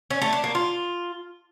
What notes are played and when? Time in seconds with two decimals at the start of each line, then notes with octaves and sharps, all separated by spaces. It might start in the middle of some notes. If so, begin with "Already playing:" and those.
0.10 C#4
0.22 A3
0.33 D4
0.44 A#3
0.55 F4